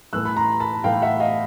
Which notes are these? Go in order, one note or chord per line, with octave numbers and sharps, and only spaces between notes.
A2 E3 A3 E6 F#6
B5
A#5 C6
A5 B5
A2 E3 A3 F5 G5
E5 F#5
D#5 F5